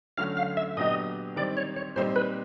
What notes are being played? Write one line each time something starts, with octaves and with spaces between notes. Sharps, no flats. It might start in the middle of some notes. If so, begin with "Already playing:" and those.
D3 F#3 A3 C#4 F#4 F5
F5
E5
A#2 F#3 B3 D4 G4 D#5
D#3 G3 C4 D5
C#5
C#5
A#2 G3 C4 D#4 C5
B4